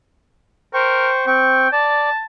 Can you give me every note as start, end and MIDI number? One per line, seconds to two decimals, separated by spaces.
0.74 1.10 70
0.74 1.26 72
0.74 1.26 79
0.74 1.26 85
1.27 1.68 60
1.27 1.71 79
1.27 1.68 85
1.73 2.10 74
1.73 2.24 81